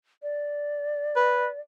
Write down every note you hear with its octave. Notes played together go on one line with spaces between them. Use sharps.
D5
B4